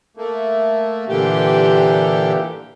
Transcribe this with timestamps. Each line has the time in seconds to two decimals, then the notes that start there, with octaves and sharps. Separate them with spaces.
0.17 A3 A#3
1.08 A#2 D3 E3 G4